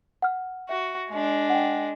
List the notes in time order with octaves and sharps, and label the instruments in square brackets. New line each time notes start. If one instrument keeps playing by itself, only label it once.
[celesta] F#5 F6
[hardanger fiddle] F#4 [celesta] E5
[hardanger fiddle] G#3 D4
[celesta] F#5 G5